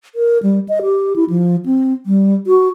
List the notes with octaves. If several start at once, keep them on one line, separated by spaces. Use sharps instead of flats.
A#4
G3
D#5
G4
E4
F3
C4
G3
F#4